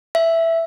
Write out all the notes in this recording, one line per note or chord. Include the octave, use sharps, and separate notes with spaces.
E5